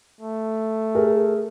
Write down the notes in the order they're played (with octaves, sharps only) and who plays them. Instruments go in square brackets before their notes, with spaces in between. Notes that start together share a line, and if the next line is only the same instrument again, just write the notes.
[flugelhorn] A3
[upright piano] G#4 A#4